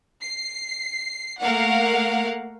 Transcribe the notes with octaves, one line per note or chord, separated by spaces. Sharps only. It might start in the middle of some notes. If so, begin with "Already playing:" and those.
C7
A3 A#3 A#4 F5 F#5